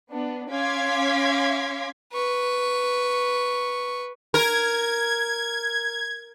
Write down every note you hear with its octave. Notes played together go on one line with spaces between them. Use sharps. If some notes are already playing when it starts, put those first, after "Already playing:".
B3 D4
C#4 F5 C6 D6 G#6 B6
B4 C#6
A#4 G#6